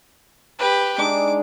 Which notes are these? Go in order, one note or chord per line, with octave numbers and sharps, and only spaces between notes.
G4 B4
G#3 D4 D#4 D6